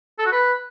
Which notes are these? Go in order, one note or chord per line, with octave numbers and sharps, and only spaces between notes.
A4
F#4
B4